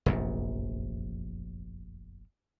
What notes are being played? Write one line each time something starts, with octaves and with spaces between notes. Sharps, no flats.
F1 A#1 F#2